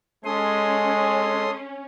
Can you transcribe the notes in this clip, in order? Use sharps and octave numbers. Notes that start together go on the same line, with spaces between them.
G#3 C#4 A4 C6 D#6